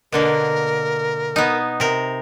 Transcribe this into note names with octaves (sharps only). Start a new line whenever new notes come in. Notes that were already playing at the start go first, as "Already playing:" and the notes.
B2 D3 A#3 A#4
B3 D#4
C3 A#4